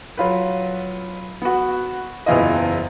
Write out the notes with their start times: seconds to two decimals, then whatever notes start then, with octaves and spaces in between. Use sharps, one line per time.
0.17 F#3 F4 B4
1.42 B3 F#4
2.26 F#1 E2 E3 F4 D#5